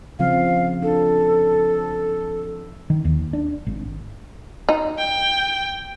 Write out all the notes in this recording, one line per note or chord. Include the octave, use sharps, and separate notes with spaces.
C#3 F3 C4 F5
D4 A4
D#3
D#2
D4
G#1
D#4
G5